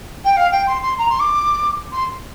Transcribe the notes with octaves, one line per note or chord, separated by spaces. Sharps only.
G5
F5
G5
C6
C6
A#5
C6
D6
C6